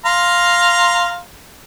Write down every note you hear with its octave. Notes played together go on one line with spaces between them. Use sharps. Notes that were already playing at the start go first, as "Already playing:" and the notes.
F5 A#5 C6